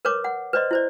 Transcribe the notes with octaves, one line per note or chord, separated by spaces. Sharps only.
A#4 B4 C#5 D6
F#5
B4 C5 D5 D#5 C6
E4 C5 D5